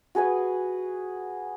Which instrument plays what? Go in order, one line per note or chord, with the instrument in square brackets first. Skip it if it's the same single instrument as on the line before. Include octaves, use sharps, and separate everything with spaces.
[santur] F#4 G#4 B4 G#5